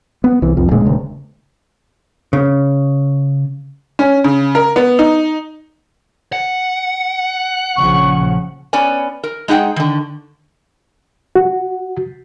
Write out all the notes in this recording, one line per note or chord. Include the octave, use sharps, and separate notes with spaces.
B3
C2 E3
C2 F2 F3
D#1 D2 A#2 G#3
D#1 D2 C#3
C#3
C#4
C#3
A#4
B3
D#4
F#5
A#1 C#3 F3 C#6
B3 C#4 D5 G#5
A#4
G#3 D#4 G#4 F#5 G5
D3 D#3
F#4